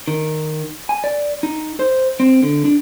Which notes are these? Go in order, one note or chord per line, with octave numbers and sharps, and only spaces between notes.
D#3
G#5
D5
D#4
C5
C4
D3
D4